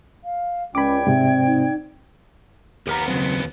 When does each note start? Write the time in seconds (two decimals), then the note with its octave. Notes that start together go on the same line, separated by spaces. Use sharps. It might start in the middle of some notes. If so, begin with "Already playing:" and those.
0.25 F5
0.75 C#2 C#4 D5 G5 B5 D6 G#6
1.07 G#2 C3 C4 E5
1.46 D#4
2.87 D#2 B3 G4 A#4 A#5
3.08 C#3 F#3 C4